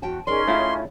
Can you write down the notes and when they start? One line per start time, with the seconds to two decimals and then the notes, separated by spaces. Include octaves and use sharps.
0.02 E2 F#4 G5 A5
0.27 C#4 D#4 G#4 A#4 D5 C6
0.47 A3 E4 F4 C#5 F5